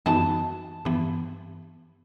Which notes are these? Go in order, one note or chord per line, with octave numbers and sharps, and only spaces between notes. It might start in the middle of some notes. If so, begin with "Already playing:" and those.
F#2 E3 B3 D#4 F#4 A5
G2 E3 B3